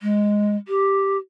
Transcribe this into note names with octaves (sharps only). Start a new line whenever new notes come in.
G#3
G4